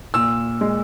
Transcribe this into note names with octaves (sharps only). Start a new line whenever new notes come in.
A#2 E6
G#3